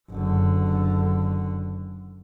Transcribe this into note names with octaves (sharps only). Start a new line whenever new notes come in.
F#1 D3